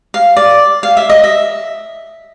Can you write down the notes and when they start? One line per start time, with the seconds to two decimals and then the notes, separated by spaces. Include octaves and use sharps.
0.14 F5
0.36 D5
0.83 F5
0.97 E5
1.10 D#5
1.24 E5